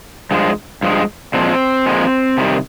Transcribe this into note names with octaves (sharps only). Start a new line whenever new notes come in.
G2 F3 G#3
G2 F3 G#3
A#2 F3 G#3 C4
A#2 F3 G#3
C3 D#3 G3